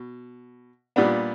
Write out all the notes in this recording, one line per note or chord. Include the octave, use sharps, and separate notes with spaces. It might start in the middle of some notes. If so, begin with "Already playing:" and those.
Already playing: B2
A#2 G3 B3 D4